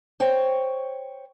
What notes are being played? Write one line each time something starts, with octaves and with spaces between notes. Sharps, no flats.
C5 C#5 G5